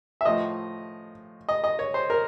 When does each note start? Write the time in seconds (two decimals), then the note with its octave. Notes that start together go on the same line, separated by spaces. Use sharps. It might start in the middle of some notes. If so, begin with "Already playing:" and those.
0.21 E5
0.25 A2 F3 D#5
1.49 D#5
1.64 D#5
1.79 C#5
1.94 C5
2.10 A#4